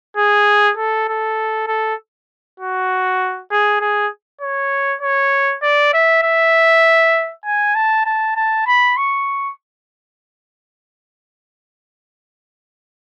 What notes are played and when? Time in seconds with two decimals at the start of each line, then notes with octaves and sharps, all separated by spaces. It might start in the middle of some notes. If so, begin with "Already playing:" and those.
0.17 G#4
0.77 A4
1.08 A4
1.68 A4
2.60 F#4
3.51 G#4
3.81 G#4
4.41 C#5
5.01 C#5
5.62 D5
5.94 E5
6.23 E5
7.45 G#5
7.75 A5
8.06 A5
8.36 A5
8.66 B5
8.97 C#6